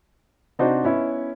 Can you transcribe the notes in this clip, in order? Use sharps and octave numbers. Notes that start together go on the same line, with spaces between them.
C3 D4 D#4 F#4 C5
B3 C#4 E4